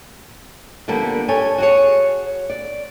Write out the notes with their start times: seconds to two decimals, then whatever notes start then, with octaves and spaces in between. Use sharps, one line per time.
0.88 D3 F3 G3 A#3 B3
1.29 G4 A4 C#5 G#5
1.58 F#4 G#4 C#5
2.50 D5